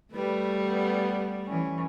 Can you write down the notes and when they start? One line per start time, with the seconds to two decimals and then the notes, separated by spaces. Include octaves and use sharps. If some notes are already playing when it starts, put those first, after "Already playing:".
0.13 G3 A3 B4
0.68 B3
1.46 E3 C#4